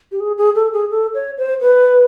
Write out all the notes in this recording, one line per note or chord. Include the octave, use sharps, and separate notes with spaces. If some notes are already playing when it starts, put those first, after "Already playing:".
G4
G#4
G#4
A4
G#4
A4
C#5
C5
B4